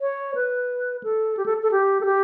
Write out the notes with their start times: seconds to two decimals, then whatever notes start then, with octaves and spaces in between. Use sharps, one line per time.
0.01 C#5
0.35 B4
1.03 A4
1.37 G4
1.46 A4
1.63 A4
1.72 G4
2.01 A4
2.05 G4